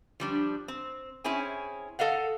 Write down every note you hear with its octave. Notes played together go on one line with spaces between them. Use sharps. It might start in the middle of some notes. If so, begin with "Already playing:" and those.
F3 G3 D4
C4
C4 C#4 E4 G#4 G#5
A4 D#5 F5 F#5